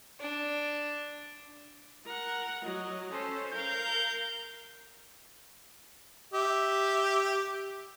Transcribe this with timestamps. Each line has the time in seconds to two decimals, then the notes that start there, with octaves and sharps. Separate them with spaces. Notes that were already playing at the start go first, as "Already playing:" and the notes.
0.20 D4
2.06 A#4 F#5
2.64 F#3 D#5
3.11 C#4 A4 C5
3.53 A#4 F5 G6
6.34 G4 E5